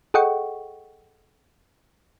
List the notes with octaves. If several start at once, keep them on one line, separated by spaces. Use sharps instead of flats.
G#4 A4 D#5 F#5 G5 C#6